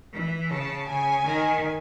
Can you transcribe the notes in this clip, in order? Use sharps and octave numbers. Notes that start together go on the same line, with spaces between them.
E3
C#3 A5
C#3 G#5
D#3